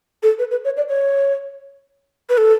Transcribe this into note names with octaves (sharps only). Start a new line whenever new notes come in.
A4
B4
B4
C#5
D5
C#5
B4
A4